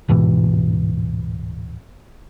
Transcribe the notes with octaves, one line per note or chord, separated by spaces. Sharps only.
D1 G#2 B2 E3